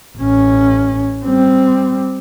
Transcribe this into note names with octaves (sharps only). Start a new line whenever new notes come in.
A1 C#4
G3 C4